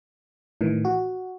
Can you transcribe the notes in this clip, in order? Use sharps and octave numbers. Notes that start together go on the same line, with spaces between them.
A2 D#3 E3
F#4